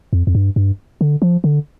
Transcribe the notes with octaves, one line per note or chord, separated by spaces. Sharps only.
F2
F2
G2
G2
D3
F3
D3